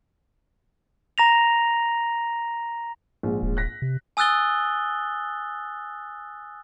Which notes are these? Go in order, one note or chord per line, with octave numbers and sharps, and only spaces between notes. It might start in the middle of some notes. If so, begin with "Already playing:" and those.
A#5 A#6 F7
A#1 G#2
D#1
F#6 A#6 B6
C3
G#5 D#6 E6 F#6 A6 G7